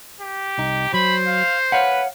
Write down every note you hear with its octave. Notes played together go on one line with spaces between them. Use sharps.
G4
C2 D#4
F#3 C5 B5
F5
B4 C#5 F5 F#5